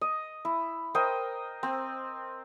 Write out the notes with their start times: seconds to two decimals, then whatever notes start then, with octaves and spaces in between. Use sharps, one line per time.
0.01 D#5
0.45 E4
0.95 A#4 C5 D#5 G5
1.63 C4